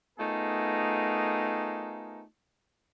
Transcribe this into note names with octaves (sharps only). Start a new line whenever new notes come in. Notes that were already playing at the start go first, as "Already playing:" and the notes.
A3 B3 D#4 F4 G#4 A#4